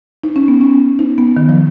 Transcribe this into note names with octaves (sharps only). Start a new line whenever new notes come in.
D#4
C#4
B3
C#4
D#4
B3
D#3
F3